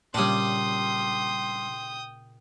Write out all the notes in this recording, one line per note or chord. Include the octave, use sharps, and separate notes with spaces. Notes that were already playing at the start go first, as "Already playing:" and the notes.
A#2 C#3 G3 D4 G5 C6 D#6